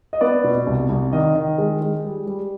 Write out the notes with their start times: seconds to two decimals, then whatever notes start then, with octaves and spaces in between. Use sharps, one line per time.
0.13 D#5
0.21 B3 D5
0.44 B2
0.67 C2
0.90 C2
1.13 D#3 D#5
1.35 D#3
1.58 G#3
1.81 G#3
2.04 G3
2.27 G3